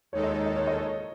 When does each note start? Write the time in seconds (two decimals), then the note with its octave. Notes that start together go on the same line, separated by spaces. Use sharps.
0.12 D#2 D#3 G#3 D#4 A4 C#5
0.23 D#5
0.34 C#5
0.46 D#5
0.56 C#5
0.67 D#5
0.78 C#5